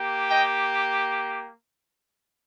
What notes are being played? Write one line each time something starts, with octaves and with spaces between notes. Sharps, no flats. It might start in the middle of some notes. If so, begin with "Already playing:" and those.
Already playing: A#3 G4
D#5 G5